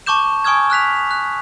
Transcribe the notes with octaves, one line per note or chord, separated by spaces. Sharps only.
A5 C#6 D6 G6 E7
G#5 C#6 D#6 F6 G#6
F6 F#6 B6 F7
F#6